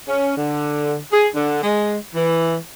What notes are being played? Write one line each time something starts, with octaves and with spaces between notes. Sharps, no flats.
C#4
D3
G#4
D3
G#3
E3